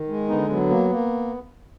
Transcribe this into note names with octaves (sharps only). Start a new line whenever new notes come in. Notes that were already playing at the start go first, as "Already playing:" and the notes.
Already playing: D#3
G#3
D3 B3 D#4
F#3 B3
A#3
A#3